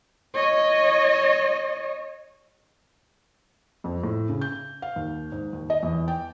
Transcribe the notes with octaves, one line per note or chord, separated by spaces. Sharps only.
C#5 D#5
F2
A2
C#3
G6
F5
D#2
G#2
D#2
D#5
E2
G5